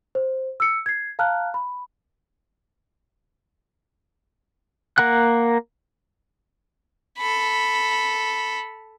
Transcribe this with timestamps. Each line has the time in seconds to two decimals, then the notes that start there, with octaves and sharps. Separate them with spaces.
0.15 C5
0.60 E6 C#7
0.86 G#6 C7
1.19 F5 A5 A#5 F6 F#6
1.54 B5
4.98 A#3 A#4 F#5 F#6
7.18 A4 B5